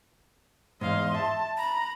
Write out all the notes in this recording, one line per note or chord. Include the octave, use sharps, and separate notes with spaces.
E2 G#2 D#5 F5 C6
E5 A5
A#5 B5